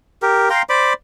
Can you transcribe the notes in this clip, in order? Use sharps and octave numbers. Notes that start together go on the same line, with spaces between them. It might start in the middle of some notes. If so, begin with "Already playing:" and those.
G4 A#4
F5 G5 A#5 C6
C5 D5 B5 D6